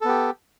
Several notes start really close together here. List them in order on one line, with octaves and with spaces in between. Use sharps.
A4 B3 G4